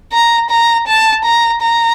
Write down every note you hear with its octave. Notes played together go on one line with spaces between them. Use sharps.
A#5
A#5
A5
A#5
A#5